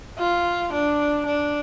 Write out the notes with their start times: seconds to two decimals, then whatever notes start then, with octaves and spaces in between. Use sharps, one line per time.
0.19 F4
0.73 D4
1.26 D4